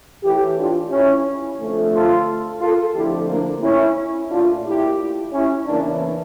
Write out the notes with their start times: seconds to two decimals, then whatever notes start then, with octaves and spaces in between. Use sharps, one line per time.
0.23 A2 E3 A3 E4 G4
0.57 D4 F4
0.91 C#4 E4
1.59 F2 D3 F3 A3
1.93 F4 A4
2.61 F4 A4
2.95 F2 D3 F3 A3 E4 G4
3.28 A#3 D4
3.63 C#4 E4
4.30 A#2 A3 D4 F4
4.65 E4 G4
5.33 C#4 E4
5.66 E2 C#3 E3 A#3 D4